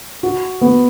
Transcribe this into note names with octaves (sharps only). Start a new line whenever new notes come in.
F#4
B3